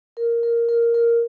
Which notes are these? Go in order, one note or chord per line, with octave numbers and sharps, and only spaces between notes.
A#4
A#4
A#4
A#4